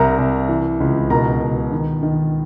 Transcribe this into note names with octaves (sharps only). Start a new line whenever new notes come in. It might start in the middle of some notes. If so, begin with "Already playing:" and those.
Already playing: C2 A#4 A#5
C2
E3
C#2
B2 A#4 A#5
B2
D#3
D#3